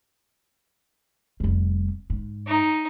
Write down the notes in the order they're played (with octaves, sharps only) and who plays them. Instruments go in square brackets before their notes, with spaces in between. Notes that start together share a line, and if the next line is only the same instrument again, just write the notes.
[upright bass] F1 G3
G#2
[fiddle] D#4